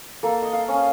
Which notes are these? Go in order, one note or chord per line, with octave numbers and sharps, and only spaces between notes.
A#3 A4
D#5
F5
C#4